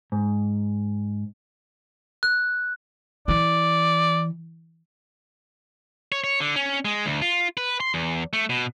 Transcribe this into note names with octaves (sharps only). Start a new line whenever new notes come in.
G#2
F#6
E3 D5
C#5
C#5
D3
C#4
G#3
D2
F4
B4
C6
E2
A3
B2